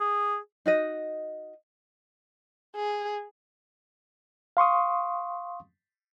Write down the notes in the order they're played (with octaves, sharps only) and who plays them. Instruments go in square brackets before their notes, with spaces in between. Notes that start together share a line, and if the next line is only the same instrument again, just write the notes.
[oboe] G#4
[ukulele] D#4 F#4 D#5
[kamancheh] G#4
[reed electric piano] F5 C6 C#6 D#6